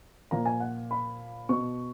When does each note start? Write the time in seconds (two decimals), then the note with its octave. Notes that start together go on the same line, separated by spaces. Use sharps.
0.31 A#2 F3 A#5
0.46 G#5
0.60 F#5
0.91 B5
1.49 B2 C#6